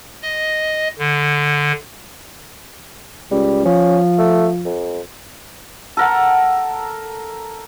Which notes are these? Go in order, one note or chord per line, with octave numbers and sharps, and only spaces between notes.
D#5
D3
C#2 G3
F3 C#4
A3
F2
A4 A#4 F#5